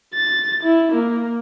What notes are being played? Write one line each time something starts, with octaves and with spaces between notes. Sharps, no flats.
A6
E4
A#3